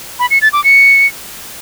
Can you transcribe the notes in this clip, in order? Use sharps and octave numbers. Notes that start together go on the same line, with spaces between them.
B5
C#7
A6
D6
C#7